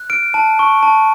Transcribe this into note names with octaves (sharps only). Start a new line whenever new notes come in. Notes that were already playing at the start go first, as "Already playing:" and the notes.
Already playing: F#6
F6 D7
A5
C#6
A5